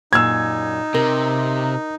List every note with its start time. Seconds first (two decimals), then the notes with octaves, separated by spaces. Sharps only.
0.13 F#2 A#2 D#4 E6 G#6
0.94 C3 A#4